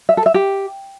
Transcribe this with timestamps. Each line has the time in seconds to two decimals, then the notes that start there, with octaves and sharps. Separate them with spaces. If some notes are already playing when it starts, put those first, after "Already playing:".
0.09 E5
0.17 A4
0.26 E5
0.34 G4